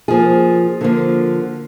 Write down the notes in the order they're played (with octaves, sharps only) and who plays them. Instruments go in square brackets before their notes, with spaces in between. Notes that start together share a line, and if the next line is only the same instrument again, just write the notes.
[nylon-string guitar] F3 A#3 F4 G#4
D3 F3 A#3 F4